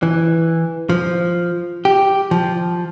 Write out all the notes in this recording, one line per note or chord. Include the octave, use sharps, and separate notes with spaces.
E3
F3
G4
F3